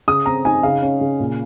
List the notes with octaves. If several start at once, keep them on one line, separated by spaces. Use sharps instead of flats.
C#3 D#6
C4 A#5
D#4 G#5
C#3 F5
C#4
C#3
A#2